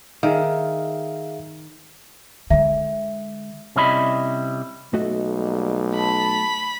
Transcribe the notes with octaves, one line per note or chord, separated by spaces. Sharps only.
D#3 G#4 E5 F5
D3 G#3 E5
C3 G3 C#4 E4 D#5 B5
B1 A3 F#4 D#5
G3 A#3
A5 B5